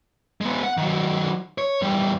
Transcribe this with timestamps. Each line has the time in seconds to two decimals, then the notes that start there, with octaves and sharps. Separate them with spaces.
0.41 G#3 B3
0.63 F#5
0.77 D#3 F#3
1.58 C#5
1.82 E2 G3